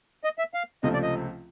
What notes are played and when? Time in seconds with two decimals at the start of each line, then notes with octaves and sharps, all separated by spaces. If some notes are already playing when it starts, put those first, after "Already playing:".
0.24 D#5
0.38 E5
0.54 F5
0.83 C#2 C3 F3 A3 C4 D#5
0.93 D5
1.03 D#5